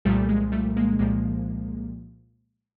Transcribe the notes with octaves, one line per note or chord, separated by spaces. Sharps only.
C2 A#2 F3 G3 A3
G#3
G3 A3
G#3 A#3
C2 A#2 F3 G#3 A#3